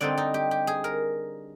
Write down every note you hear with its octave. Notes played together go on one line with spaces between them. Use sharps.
D3 G3 C4 D#4 D5
D#4
G4
G4
G#4
A#4